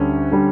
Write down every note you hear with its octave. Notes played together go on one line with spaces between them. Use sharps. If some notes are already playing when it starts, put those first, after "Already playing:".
Already playing: D2 D3 G3 C#4
D3 G3